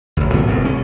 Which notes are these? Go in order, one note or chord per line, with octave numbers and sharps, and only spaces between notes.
A1 D2
D2 G#2 B3
F1 C2 F#2
C2 C#4